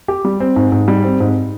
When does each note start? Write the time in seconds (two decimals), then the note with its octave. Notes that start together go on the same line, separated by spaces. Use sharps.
0.08 G4
0.25 G3
0.40 C4
0.56 G#2
0.72 G#2
0.88 G3
1.04 C4
1.20 G#2